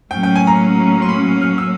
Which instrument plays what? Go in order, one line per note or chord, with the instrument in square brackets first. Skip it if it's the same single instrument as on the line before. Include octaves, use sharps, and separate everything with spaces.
[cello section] A2 F#3 A#3 C#4 [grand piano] G5
[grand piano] G5
G#5
A#5
C6
B5
F6
E6